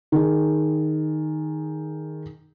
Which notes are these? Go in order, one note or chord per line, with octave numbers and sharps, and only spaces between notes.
D#3 G#4